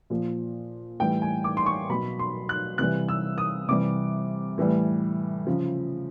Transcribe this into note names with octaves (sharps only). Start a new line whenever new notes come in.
A#2 F3
A2 E3 G3 G5
G#5
D6
C6
C#6
B2 F#3 B5
C6
F#6
C3 E3 G3 F#6
E6
D#6
C3 E3 G3 D6
A2 E3 G3
C#3 F3